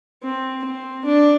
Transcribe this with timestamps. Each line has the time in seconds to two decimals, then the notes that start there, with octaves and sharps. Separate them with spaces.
0.23 C4
0.64 C4
1.05 D4